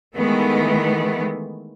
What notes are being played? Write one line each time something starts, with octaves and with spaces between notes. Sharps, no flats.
D#3 E3 G#3 A3 B3